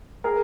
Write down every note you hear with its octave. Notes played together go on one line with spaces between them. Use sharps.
G#4 A#4